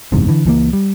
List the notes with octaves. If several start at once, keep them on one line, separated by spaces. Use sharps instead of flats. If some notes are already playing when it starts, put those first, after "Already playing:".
F#1 E2 G#2 C3
D3 E3
C#2 E3 A3 A#3
G3